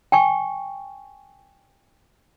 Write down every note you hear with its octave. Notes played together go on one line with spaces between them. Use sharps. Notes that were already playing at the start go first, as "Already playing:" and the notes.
G5 G#5 C#6